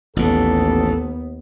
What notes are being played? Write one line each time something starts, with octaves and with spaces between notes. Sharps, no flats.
A1 D#2 A#2 B3 A4